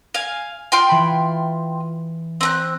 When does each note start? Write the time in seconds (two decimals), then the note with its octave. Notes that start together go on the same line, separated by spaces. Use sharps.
0.14 F5 G#5
0.72 F4 G5 C6
0.89 E3 B5
2.41 C4 A#5 F#6